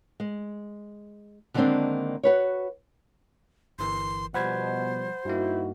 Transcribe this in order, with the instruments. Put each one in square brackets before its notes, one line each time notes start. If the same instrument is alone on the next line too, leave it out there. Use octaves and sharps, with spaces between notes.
[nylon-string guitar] G#3
D3 D#3 G#3 A#3 C4 D4
F#4 B4 C#5
[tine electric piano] G1 E3 A#4 [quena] C6
[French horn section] B2 [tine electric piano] F3 G3 [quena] C5 [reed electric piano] F#5 B5 G#6
[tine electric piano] G2 A#3 [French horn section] D#4 E4 F#4